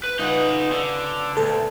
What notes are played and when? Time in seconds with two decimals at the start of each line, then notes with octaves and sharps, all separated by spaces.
0.04 B4
0.19 C#3 D#4 F4 B4 F#5
0.72 D3
1.37 D2 A#2 B3 A4 C5